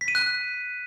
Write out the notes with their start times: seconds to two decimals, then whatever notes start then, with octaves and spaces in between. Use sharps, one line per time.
0.01 B6
0.08 D#7
0.15 F#6